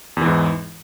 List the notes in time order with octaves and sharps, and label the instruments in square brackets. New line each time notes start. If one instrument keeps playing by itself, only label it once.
[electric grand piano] E2
E3
G#2